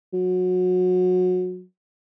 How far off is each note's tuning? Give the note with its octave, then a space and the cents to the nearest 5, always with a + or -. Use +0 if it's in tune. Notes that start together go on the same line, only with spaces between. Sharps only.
F#3 -25